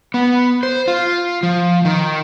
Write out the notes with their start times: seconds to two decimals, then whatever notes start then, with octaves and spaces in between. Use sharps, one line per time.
0.14 B3
0.63 C5
0.88 F4
1.43 F3
1.85 D#3